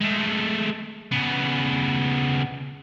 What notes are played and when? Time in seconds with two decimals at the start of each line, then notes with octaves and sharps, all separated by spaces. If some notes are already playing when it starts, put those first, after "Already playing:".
0.01 G#3 A3
1.12 C#3 B3